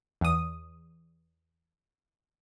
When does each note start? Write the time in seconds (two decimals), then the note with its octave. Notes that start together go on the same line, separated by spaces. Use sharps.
0.21 E2 D#6